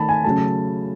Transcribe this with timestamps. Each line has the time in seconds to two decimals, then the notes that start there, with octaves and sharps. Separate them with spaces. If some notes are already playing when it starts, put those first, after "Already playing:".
Already playing: D#3 A3 A5 B5
0.09 G#5
0.24 C#3 F#3 A3 A5